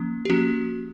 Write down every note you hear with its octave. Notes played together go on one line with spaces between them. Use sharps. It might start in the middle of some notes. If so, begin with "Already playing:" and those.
Already playing: F3 A#3 C#4
G4
F3 A#3 C#4 F#4